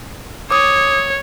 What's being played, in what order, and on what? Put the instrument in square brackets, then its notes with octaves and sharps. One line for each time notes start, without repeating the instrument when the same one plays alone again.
[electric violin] C#5 [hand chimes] D6 D#6